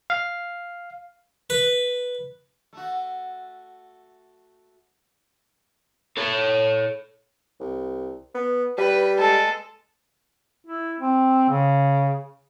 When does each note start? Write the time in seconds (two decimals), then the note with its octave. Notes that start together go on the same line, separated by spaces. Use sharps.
0.10 F5
1.50 B4
2.73 A3 F#4
6.17 A4 C#5
7.60 C2
8.35 B3
8.78 G3 B4
9.18 G#3 A4
10.67 E4
11.00 C4
11.50 C#3